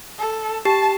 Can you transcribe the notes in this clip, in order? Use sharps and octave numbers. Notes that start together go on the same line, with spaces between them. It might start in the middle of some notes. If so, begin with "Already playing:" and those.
A4
G4 A5